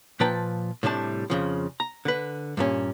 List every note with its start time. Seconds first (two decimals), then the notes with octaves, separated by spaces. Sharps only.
0.20 A#2 F3 B4 G5 A5 A#5
0.83 A2 C3 G3 D4 A5
1.30 F2 C#3 F3
1.80 A#5
2.05 D3 B4
2.57 G2 A#2 C#4